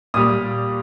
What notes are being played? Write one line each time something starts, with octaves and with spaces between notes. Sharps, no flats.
A#2 G3 D#6